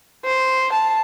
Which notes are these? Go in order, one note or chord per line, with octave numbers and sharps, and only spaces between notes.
C5
A5